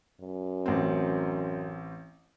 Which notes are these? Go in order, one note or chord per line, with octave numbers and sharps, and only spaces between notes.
F#2
A1 C4